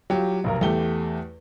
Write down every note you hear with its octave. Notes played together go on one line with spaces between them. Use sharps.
F#3 F4 G4
F1 B1 A#4
E2 A3 G4 G7